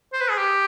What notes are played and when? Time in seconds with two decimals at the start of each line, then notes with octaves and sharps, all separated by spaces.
0.13 C5
0.21 B4
0.30 G#4
0.38 G4